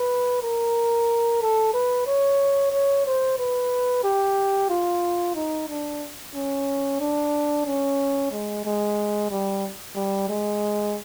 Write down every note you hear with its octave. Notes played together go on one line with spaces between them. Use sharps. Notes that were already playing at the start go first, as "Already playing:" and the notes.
Already playing: B4
A#4
A4
B4
C#5
C#5
C5
B4
G4
F4
D#4
D4
C#4
D4
C#4
G#3
G#3
G3
G3
G#3